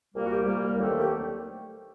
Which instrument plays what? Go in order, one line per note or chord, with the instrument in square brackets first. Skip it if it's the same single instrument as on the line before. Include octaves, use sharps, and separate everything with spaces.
[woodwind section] C2 A#2 G3 A#3
F#4
G4
C2 A#2 G3 A#3
D#2 D3 F#3 A3 C4
G4